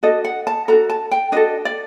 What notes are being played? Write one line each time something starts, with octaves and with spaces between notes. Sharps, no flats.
D4 F#4 A4 D#5
F#5
A5
D4 F#4 A4 A#5
A5
G5
D4 F#4 A4 D#5
D5